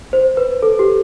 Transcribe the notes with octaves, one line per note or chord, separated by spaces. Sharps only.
C5
B4
A4
G4